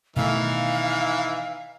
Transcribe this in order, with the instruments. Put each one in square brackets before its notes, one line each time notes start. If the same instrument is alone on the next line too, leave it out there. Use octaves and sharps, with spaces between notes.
[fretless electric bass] B2 D#3 A3 [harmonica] E3 [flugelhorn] D#4 [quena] F5